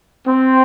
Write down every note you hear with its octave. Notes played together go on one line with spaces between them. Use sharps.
C4